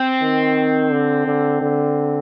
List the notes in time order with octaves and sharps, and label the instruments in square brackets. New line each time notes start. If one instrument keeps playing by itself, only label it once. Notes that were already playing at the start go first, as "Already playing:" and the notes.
Already playing: [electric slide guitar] C4
[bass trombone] D#3
D3
D3
D3